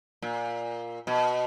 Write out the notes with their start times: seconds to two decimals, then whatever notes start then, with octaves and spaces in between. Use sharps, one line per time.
0.22 A#2
1.07 B2